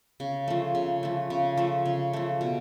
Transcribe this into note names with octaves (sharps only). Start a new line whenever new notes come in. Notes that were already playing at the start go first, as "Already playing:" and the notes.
C#3
F3 A3
C#3
F3 A3
C#3
F3 A3
C#3
F3 A3
B2